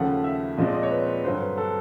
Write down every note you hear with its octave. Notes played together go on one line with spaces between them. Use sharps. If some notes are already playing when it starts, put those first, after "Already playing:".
Already playing: D#2 C#3 F3 A3 F#5
E5
A#2 F3 G#3 C4 D#5
D5
D#5
C#5
B4
B4
G2 D3 F#3 C5
B4
A4